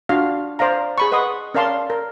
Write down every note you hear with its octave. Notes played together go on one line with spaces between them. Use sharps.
D4 F4 F#4 F5
C5 D5 F5 A#5
G#4 B5 C#6
B4 D#5 F#5 C6 D#6
C#4 A#4 D5 F5 A5 C6
A#4